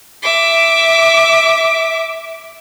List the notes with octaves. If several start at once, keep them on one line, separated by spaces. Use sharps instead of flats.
E5 D6